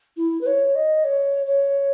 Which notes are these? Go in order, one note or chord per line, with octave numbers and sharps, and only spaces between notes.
E4
B4
C#5
D#5
C#5
C#5